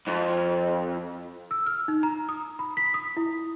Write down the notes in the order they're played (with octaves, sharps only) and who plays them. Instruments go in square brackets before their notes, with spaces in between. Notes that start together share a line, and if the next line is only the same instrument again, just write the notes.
[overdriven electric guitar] F2
[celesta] E6
F6
D#4
A#5
D#6
B5
B6
D#6
E4